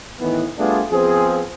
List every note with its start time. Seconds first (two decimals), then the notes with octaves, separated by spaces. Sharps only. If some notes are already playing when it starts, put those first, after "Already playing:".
0.19 A2 D#3 E3 B3
0.58 G3 A3 B3 D4 F4 G#4
0.91 F3 B3 C4 G#4